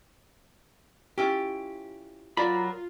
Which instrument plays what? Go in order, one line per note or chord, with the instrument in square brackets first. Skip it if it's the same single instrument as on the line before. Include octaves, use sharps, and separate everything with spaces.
[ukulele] C#4 E4 F4 [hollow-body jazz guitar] G4
[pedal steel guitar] F#3 A#4 B5 [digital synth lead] F4 [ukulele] D5